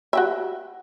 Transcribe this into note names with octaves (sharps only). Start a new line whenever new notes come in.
F#4 G4 E5